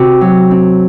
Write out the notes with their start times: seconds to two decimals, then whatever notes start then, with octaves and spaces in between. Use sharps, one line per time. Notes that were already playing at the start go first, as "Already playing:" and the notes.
Already playing: C3 F#4
0.21 F#3
0.51 C4